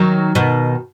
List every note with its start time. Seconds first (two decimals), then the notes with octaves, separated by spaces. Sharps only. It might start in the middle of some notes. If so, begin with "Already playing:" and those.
Already playing: D#3 F#3
0.35 B2 D#3